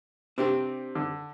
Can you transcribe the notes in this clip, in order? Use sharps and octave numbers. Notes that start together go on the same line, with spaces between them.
C3 C4 D4 G4
D3